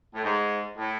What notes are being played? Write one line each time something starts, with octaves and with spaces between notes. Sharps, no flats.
A2
G#2
A2